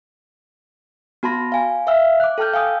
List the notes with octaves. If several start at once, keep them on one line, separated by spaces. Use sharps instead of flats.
B3 F#4 A5 B5 C6 A#6
F5 G#5
E5 F5 G5 E6 F6
D6 F#6
A4 G5 A5 F6 G6
F5 G5 G#5 D#6 E6 G6